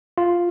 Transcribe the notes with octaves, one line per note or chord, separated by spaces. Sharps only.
F4